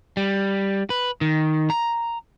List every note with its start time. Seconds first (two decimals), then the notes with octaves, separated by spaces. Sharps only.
0.17 G3
0.90 B4
1.21 D#3
1.70 A#5